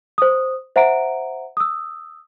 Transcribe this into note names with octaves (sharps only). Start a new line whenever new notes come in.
C5 D#6
C5 E5 F#5 A#5 D7
D#6 E6